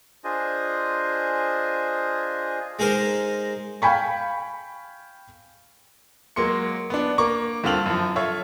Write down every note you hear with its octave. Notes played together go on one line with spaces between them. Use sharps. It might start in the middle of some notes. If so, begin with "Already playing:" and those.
D4 F4 G#4 C5 D#5 G#5
G#3 D#4 G#4 A#4 C5
F5 G5 G#5 B5 C#6
F#3 G#3 A#3 C6 C#7
B3 D4
A#3 A#5 C#6 D6
G2 D3 C4 F4 F7 F#7
F#2 F3
F4 A4 C#5 E5